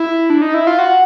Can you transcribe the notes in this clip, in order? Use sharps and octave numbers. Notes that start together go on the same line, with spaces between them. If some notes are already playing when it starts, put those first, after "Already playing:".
Already playing: E4
D4
D#4
E4
F4
F#4